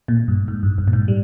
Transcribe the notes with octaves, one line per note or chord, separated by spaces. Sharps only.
A#2
G2
G#2
G2
G2
A#2
G#2
G3